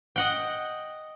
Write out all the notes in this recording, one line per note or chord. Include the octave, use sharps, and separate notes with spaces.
D#5 F#5 G5